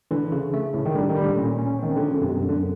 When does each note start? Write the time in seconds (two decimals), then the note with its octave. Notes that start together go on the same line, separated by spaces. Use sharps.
0.11 D3 E3
0.32 C#3
0.54 A3
0.74 A2
0.85 D#3
0.95 D3 G3
1.09 D#3
1.17 G3
1.22 D3
1.37 A#2 C#4
1.59 C#4
1.79 D#3 C4
1.96 D3 F3
2.08 C#3
2.21 F#2 C3
2.29 B2
2.35 C3
2.43 F#2
2.49 D3